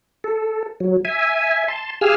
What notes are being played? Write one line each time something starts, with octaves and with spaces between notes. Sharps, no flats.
A4
F#3
E5 G#5
A5 C6
G4 G#4 F5 G#5 E6 F6